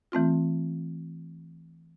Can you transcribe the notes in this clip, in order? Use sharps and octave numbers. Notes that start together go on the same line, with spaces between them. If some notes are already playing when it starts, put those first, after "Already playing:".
E3 A3 C4 F4